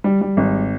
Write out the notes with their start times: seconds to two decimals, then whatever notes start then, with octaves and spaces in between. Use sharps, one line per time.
0.04 G3
0.21 G3
0.37 G#1